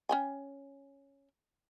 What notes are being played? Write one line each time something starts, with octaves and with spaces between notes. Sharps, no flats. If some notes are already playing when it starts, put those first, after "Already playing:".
C#4 G5 G#5